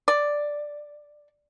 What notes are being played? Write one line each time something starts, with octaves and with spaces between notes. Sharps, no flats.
D5